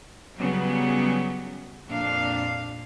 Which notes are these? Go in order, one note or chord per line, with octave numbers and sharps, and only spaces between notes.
C#3 F#3 G3 B3
F2 A#2 D4 F5